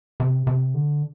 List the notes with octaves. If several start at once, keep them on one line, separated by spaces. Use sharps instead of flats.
C3
C3
D3